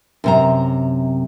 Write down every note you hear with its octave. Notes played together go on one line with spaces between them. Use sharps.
F#2 C3 A#5